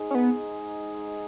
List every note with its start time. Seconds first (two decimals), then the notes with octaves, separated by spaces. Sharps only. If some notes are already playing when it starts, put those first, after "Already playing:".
Already playing: G#2 G#3 D#4 G#4
0.10 C#4
0.15 B3